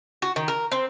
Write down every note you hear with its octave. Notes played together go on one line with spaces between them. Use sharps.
F#4
D#3
A#4
C4